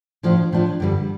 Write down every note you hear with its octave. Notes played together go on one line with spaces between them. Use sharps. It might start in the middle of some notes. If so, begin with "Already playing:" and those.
A2 F3 D4 F4
A2 F3 D4 F4
G2 D3 G3